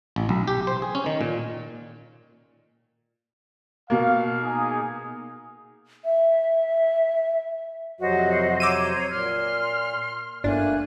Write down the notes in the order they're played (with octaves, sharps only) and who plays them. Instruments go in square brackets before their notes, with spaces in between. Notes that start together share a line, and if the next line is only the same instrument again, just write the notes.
[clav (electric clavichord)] A1
B1
G4
C5
G#4
C#4
D#3
A#2
[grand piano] B2 A#3 [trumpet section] F5
[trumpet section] D#4 G#4
[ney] E5
[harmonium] F2 C3 F#3 [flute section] F#4 C5 D#5
[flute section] C5 C#5 A#5 [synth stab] D6 E6 D#7
[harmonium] A#2 [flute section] C6 F6
[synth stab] G1 D4 [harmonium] A3 A#3 [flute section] G#5 F#6